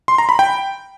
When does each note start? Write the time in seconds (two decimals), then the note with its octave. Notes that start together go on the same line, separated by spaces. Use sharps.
0.08 C6
0.18 A#5
0.29 B5
0.39 G5